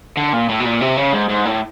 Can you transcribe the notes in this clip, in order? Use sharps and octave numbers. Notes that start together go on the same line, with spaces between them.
D3
A#2
A2
B2
A#2
C3
C#3
G#2
G#2
A2